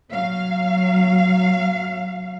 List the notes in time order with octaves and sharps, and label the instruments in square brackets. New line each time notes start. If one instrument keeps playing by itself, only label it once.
[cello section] F#3 F5